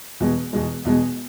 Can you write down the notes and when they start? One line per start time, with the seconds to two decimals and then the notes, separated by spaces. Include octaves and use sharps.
0.20 E2 B2 G#3
0.53 E2 B2 G#3
0.85 E2 B2 G#3